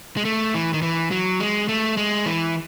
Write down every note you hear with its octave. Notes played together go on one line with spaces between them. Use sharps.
G#3
A3
E3
D#3
E3
F#3
G#3
A3
G#3
E3